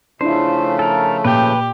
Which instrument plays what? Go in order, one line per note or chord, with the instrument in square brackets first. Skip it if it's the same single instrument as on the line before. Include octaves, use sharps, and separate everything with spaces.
[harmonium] C#3 F3 A3 [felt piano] D4 E4 [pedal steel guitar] C5
[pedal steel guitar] A4 A#4
[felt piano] A#2 [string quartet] G4 [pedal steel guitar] B4 G5